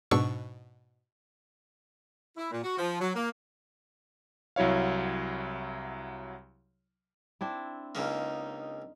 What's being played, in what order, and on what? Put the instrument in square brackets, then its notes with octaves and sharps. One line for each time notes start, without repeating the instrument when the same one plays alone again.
[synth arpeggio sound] G#2 B2 D4 C#6 E6
[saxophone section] E4
A#2
F#4
F3
F#3
A#3
[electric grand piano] C2 F#3 E4 C#5 F5
[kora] C4 D4 E4
[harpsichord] C#2 C#3 A#3 [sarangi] D#4